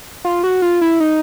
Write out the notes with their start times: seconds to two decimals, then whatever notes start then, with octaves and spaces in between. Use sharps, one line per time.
0.25 F4
0.44 F#4
0.62 F4
0.81 E4
1.00 D#4